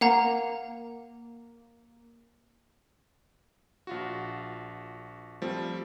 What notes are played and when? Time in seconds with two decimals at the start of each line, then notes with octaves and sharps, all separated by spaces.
0.01 A#3 F5 F#5 A#5
3.87 A#1 F4 F#4
5.42 F3 G3 A3 C4